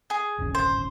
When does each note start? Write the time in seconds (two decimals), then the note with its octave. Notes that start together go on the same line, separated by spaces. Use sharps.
0.10 G#4
0.38 D1 G#1 C#4
0.55 C5